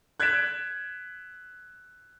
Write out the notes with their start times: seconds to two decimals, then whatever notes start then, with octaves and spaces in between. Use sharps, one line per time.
0.20 F#6 G#6 A6 B6 D7 E7